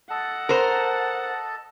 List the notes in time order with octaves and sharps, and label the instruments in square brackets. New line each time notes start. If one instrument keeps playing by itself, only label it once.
[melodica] A4 D#5 A5 [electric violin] F#5
[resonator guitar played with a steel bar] A#4 C5